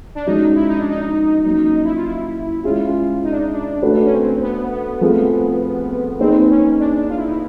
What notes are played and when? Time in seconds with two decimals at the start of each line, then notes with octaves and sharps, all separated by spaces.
0.15 D4
0.26 F3 G#3 C#4 D#4 F#4
0.55 E4
0.68 D#4
0.79 D4
0.90 D#4
1.45 F#3 A#3 C#4 D#4
1.64 D#4
1.84 E4
1.95 F4
2.06 E4
2.64 G#3 C#4 E4 F4 G#4
3.24 D#4
3.31 D4
3.38 D#4
3.52 D4
3.82 A3 D4 F#4 B4
4.05 C#4
4.13 C4
4.42 B3
4.71 B3
5.01 F3 A3 C4 F4 G#4
6.19 A#3 C4 D#4 G#4 B4
6.50 C#4
6.79 D4
7.09 F4
7.16 E4
7.24 D#4
7.30 E4